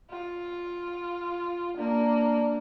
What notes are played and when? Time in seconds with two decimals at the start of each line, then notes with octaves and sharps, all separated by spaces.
0.11 F4
1.78 A#3 D4